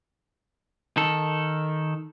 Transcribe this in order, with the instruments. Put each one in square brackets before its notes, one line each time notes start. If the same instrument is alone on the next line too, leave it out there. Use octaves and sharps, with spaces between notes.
[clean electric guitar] D#3 A4